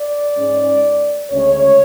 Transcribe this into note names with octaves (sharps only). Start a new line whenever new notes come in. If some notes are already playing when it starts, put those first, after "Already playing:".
Already playing: D5
G#2 G#3 C#4
D2 C#3 G#3 C#4 C#5